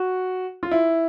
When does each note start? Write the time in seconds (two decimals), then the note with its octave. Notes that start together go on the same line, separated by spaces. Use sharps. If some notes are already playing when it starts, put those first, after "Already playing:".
Already playing: F#4
0.63 F4
0.71 E4